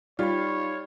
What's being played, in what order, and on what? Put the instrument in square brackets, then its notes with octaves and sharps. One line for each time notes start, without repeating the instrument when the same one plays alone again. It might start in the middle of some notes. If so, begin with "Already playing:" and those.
[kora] G3 [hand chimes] D#4 B5 [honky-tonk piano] F4 [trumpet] C#5